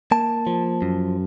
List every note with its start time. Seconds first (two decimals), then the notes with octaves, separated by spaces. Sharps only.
0.11 A#3 A5
0.47 F3
0.82 F#2